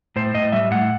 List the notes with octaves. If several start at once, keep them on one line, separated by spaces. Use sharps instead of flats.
A2 C5
A2 D#5
G3 E5
A2 F#5